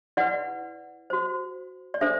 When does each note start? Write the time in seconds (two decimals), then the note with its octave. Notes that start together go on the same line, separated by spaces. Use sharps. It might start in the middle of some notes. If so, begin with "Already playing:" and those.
0.17 E4 B4 D5 F#5
1.10 F#4 C5
1.94 D5
2.01 D4 A4 C5 E5